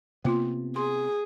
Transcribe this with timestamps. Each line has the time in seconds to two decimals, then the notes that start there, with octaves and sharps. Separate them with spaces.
0.25 C3 A#3 B3 F4 C6
0.76 G#4 C6